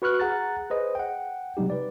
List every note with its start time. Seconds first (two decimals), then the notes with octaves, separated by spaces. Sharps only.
0.02 F#4 B4 C#6 F6 F#6
0.20 G#4 F#5 A#5 F#6 A6
0.70 G#4 B4 C5 D#5
0.95 F#5 G5
1.57 C3 F#3 G3 D#4 G4
1.70 B4 D5